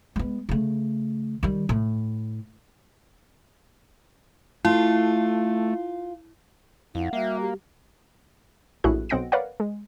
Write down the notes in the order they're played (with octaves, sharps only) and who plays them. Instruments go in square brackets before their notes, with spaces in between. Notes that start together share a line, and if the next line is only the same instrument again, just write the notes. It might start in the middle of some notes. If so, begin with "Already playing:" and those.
[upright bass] G#3 B3
C#3 A3
D#3 G3
A2
[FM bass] A3 [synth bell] E4 [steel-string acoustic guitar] F4
[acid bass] F2 [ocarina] E4 [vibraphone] F5 F#5
[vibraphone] G3 F#4 [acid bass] A#3 [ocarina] E5
[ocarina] G4
[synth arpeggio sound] A#1 A2 E4 F#4 G#4 F#6
B1 C4 D#5 F#5 A#6 D7
A#4 B4 C#5 D5 F5 F#5
G#3